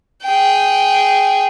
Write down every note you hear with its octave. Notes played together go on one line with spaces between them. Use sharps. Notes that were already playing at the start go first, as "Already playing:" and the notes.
G#4 G5